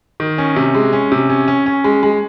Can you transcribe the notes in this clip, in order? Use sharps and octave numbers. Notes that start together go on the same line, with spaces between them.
D#3
C#4
C3
G#3
C#4
C3
C#4
C#4
C#4
G#3
G#3